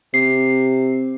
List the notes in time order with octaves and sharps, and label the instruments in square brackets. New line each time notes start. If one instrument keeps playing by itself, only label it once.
[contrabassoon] C3 [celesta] C7